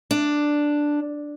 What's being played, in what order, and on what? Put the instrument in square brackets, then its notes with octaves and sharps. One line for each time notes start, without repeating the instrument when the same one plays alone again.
[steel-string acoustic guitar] D4